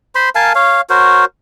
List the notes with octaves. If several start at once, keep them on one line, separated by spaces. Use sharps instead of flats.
C5 B5 C6
A#4 F5 G#5 A5
C#5 F5
F#4 A#4 C5 C#5